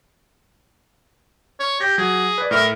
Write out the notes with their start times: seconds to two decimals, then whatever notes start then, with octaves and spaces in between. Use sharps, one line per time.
1.60 C#5
1.80 G4 A#6
1.98 F#3 G#4
2.38 B4 D5
2.51 A2 A#4 E5 F6